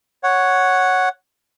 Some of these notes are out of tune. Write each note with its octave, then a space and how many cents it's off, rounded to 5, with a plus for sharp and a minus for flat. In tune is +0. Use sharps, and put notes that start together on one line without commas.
C#5 +0 F#5 +0